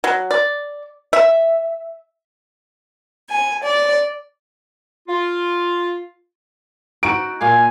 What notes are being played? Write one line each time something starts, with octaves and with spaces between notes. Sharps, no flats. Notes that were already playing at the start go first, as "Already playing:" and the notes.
F#3
D5
E5
G#5
D5
F4
D#4 F#4 D7
A#2 F5 G#5